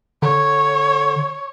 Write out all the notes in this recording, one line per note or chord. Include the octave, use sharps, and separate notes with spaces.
D3 C#5